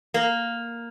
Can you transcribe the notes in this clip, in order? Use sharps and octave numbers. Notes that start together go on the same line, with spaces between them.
A#3